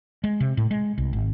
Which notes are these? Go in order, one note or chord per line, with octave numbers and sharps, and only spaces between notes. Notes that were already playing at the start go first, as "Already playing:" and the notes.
G#3
C3
A2
G#3
C2
G#1